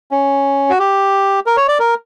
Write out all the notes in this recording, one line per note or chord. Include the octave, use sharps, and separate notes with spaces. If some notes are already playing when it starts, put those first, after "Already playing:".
C#4
F#4
G4
A#4
C#5
D5
A#4